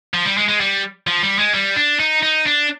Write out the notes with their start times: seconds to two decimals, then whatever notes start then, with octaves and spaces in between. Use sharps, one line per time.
0.14 F3
0.26 G3
0.38 G#3
0.49 G#3
0.61 G3
1.07 F3
1.23 G3
1.38 G#3
1.54 G3
1.76 D4
1.99 D#4
2.23 D#4
2.47 D4